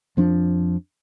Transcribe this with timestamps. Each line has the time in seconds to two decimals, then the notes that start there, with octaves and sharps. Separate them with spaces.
0.17 F2 F3 D4